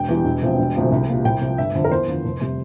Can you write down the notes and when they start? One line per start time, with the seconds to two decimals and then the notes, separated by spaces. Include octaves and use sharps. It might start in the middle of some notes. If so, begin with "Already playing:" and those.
Already playing: E1 G5
0.09 E2 E3 G3
0.25 E1
0.42 E2 C3 F3
0.58 E1
0.75 D2 C3 F3
0.92 C2
1.08 A#2 G3
1.25 C2 G5
1.42 C3 F3
1.58 G1 E5
1.75 F2 D3
1.84 A#4
1.91 E2 C5
2.08 D3 F3
2.25 F1
2.41 C3 G3